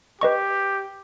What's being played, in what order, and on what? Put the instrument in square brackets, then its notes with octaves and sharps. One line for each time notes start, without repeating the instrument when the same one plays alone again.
[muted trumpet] G4 [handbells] B4 D#5 C#6